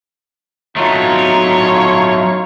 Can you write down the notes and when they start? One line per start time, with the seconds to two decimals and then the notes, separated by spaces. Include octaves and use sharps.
0.76 F#3 A3 D#4 F4 C#5